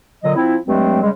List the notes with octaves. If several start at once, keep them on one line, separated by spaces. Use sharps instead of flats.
A#2 D3 F#3 D#5
F3 C4 E4
G2 F#3 G#3 A3 C4
C#3 G3 G#3